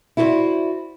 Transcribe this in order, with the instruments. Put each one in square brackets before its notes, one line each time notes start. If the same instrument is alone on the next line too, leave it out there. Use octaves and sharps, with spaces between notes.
[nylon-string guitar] E4 F#4 G#4 B4 C5 D5